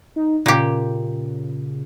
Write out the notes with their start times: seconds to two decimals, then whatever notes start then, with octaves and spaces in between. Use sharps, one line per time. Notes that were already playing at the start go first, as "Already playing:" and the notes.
0.16 D#4
0.46 A#2 C#3 G4